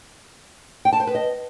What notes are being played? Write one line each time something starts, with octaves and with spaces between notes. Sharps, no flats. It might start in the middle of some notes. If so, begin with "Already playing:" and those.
G5
A5
C5
B4
D#5